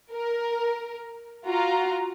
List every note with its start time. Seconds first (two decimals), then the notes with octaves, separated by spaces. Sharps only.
0.11 A#4
1.46 F4 F#4 A#5